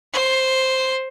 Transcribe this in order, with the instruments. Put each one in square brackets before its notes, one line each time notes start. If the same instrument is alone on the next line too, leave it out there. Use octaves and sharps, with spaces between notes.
[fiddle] C5